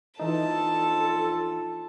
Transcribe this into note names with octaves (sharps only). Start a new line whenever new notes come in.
A#1 E3 D#4 F4 A4 A5